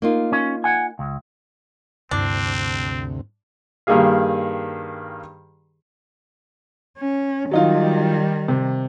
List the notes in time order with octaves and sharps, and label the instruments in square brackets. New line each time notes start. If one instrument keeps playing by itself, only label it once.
[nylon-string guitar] A#3 D#4 F4
[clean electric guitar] C#4
F#5 G#5
C#2
[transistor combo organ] D2 C3 [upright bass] G2 E4 [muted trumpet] C4 [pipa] D4
[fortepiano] G2 D#3 A#3 G4 G#4 F5
[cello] C#4
[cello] D#3 G3 [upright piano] F#3 D#4 F4
[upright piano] C3